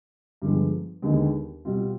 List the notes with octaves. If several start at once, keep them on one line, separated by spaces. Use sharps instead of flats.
G2 D3 F3 G#3 B3
D#2 D3 G#3 B3 D#4
B2 G3 C4 F4